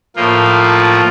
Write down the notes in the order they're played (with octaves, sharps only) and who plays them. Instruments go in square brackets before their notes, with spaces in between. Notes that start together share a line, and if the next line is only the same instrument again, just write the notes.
[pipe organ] A2 F3 A#3 F4